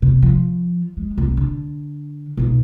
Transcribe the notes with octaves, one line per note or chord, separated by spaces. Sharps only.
C3
F3
G#3
C2
D3
B1 D#4